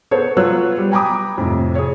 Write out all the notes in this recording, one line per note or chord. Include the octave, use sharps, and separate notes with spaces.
B3 A4 C5 C#5
F#3 B3 F4 C#5 E6 F#6
G3
G5 G#5 A#5 B5 D6 D#6
F2 A2 C3
G#4 C#5